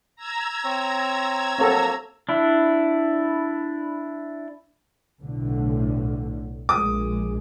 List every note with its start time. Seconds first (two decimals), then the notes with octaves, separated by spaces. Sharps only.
0.16 A#5 E6 G#6
0.64 C4 C#5
1.58 F#3 A#3 C4 A4 C#5
2.29 D4 E4
5.20 B1 A2 D3
6.69 A#1 G#3 D6 D#6